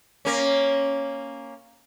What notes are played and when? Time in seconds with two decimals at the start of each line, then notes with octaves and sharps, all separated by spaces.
0.25 A#3 C#4